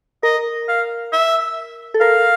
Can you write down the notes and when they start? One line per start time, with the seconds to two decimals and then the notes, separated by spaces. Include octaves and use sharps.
0.23 A#4 D#5
0.68 F5
1.12 E5
1.94 A4
2.00 A#4 F5